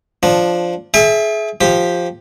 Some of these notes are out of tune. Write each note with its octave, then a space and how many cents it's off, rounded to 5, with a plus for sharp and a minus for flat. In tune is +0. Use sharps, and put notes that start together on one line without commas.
F3 +0 D4 +0
G#4 +35 E5 +0 G5 +45
F3 +0 G4 +5